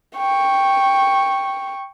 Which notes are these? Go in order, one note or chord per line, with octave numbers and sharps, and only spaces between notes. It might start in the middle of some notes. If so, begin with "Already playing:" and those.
G5 C#6